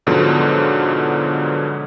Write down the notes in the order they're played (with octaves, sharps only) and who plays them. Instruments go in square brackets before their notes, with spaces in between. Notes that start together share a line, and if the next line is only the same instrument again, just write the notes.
[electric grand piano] G#2 B2 D3 F3 F#3